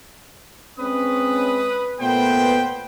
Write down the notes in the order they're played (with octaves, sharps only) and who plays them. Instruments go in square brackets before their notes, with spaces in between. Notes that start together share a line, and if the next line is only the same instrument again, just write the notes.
[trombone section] G#3 C4 C#4 [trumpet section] B4 D#6
[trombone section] A#2 A3 B3 [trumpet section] B4 C5 G5